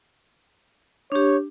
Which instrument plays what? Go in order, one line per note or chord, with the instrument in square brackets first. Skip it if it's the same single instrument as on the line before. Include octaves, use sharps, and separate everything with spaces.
[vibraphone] D4 G4 [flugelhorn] C#5